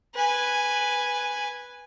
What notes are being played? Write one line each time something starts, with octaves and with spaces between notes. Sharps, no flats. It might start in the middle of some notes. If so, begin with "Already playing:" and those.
B4 G#5